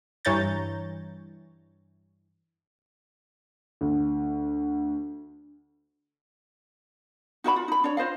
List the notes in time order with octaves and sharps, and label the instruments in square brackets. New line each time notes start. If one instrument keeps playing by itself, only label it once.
[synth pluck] G2 E3 C#5 A#5 G6 A6
[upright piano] D2
[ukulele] D#4 F#4 D#5 B5
F4
D#4 B5
D4 C#5
F4 C5 D#5 F5